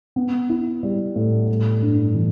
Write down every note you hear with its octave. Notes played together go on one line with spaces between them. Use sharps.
B3
E4
G3
A2
G3
G2
E3